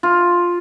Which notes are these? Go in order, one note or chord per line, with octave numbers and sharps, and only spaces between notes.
F4